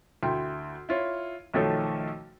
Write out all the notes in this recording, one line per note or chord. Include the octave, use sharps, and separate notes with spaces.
D2 E4 G5 C6
E4 F4 C#5
B1 D#3 F3 A3 A4 C#5